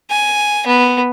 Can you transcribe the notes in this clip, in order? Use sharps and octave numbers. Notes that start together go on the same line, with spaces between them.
G#5
B3